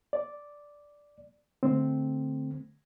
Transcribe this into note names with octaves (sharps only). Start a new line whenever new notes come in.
D5
D3 A3 C4